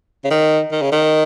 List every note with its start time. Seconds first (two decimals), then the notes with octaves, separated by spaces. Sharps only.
0.24 C#3
0.30 D#3
0.71 D#3
0.82 C#3
0.92 D#3